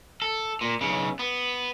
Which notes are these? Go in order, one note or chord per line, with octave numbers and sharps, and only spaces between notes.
A4
A#2
B1 C#3
B3